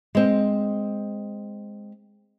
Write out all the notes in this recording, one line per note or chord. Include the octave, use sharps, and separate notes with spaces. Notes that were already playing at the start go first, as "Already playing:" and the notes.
G#3 C4